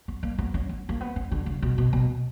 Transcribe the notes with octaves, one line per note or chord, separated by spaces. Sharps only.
B3
A#3
B3
C#4
B3
A#3
B3
C#4
D3
C#3
B2
B2
B2